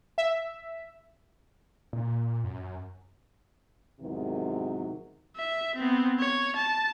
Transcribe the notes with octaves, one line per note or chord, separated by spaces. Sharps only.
E5
A#2
F#2
E2 G#2 C3 D#3 F#3
E5
B3 C4
C#5
A5